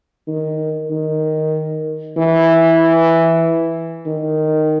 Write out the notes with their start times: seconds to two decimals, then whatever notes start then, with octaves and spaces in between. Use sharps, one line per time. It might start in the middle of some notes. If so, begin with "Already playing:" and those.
0.28 D#3
0.90 D#3
2.17 E3
4.07 D#3